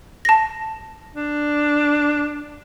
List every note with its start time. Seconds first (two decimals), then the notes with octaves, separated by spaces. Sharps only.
0.25 A5 A#6
1.15 D4